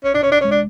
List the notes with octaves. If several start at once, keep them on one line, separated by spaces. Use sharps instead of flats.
A1 C#4
D4
C#4
D4
G#3 C#4
D4